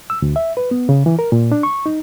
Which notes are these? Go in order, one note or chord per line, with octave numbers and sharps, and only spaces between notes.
E6
D2
E5
B4
B3
C#3
E3
A#4
A#2
D4
C#6
D#4